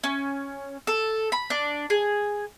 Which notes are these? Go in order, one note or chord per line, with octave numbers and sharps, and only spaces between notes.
C#4
A4
B5
D4
G#4